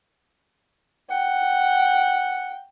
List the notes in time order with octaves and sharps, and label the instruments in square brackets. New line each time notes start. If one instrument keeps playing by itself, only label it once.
[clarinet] F#5 [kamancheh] G5